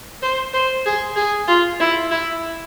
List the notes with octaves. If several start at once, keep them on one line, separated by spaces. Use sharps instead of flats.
C5
C5
G#4
G#4
F4
E4
E4